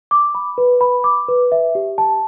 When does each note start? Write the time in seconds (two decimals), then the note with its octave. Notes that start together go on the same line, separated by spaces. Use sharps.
0.11 D6
0.35 B5
0.58 B4
0.81 B5
1.04 D6
1.28 B4
1.52 E5
1.75 G4
1.98 A5